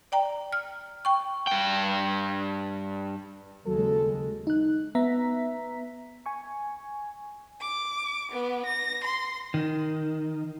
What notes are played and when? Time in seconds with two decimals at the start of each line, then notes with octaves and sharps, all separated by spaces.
0.12 D5 G5 A#5
0.52 F6
1.05 G5 C#6
1.47 G2 G5
3.66 D#2 C#3 F#3 G#3 A4
4.47 D#4 F#6
4.95 B3 E5 A#5 B6
6.26 G#5 C#6
7.59 D6
8.30 B3
8.65 A#6
9.04 C6
9.54 D#3